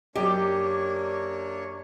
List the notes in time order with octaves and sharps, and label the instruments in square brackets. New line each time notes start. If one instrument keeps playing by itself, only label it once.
[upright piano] F#2 D#5 [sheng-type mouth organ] A#3 D4 C#5 [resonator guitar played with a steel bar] G4